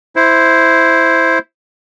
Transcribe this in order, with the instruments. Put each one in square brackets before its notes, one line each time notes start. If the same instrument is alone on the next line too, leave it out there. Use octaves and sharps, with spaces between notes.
[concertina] E4 C5